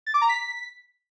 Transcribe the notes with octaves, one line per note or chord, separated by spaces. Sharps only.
A6
D6
A#5
B6